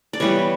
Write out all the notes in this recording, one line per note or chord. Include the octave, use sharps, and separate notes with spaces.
D5
E3 G3 B3 C#5